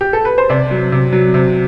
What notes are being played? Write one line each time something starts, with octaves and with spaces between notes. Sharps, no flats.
G4
A4
B4
C5
C3 D5
F#3
C3
F#3
C3